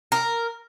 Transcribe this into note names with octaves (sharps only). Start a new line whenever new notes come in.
A#4